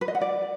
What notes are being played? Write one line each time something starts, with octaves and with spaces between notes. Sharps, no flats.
B4
D#5
F#5
D5